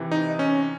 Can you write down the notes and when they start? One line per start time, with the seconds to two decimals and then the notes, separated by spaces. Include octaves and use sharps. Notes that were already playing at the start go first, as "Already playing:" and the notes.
Already playing: C3 E3
0.12 D#4
0.39 C#4